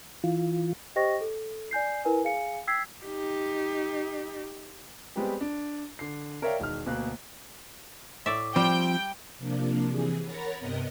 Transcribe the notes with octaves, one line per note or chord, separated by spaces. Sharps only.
E3 F4
G4 C5 D#5 G5 C#6 A#6
A4
D5 G#5 G6 C7
E4 A#4 B4 G#5
G#4 F5 G#5 C#7
G5 E6 G#6 B6 C7
D#4 G4
G3 G#3 B3 C4 G4
D4
D3 C7
A#4 C#5 D5 E5 F5 G5
E1 D#3 F6
D2 B2 A#3 F#6
A2 D5 E5
F3 G3 C4 G5
C3 F3 A#3 D4
C3 E3 G#4
A#4 C#5 F#5 B5 A6 A#6
G2 C3 B3 A#4 D#5 A#6